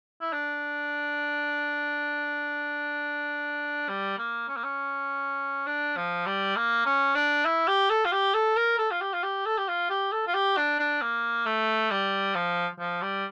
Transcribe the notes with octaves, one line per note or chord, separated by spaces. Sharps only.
E4
D4
G3
A#3
C#4
A#3
C#4
D4
F3
G3
A#3
C#4
D4
E4
G4
A4
F4
G4
A4
A#4
A4
F4
G4
F4
G4
A4
G4
F4
G4
A4
F4
G4
D4
D4
A#3
A3
G3
F3
F3
G3